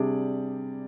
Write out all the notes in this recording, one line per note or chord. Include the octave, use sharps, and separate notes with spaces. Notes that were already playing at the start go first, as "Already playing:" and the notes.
Already playing: C3 G3 D4 G#4 D5